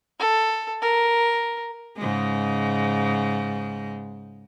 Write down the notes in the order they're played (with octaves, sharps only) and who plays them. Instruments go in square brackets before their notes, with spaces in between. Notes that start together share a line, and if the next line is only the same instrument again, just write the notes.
[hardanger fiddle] A4
A#4
[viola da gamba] G#2 C#3 G#3